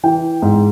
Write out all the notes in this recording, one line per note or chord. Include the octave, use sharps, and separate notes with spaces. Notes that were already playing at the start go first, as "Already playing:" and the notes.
E3 G5
G#2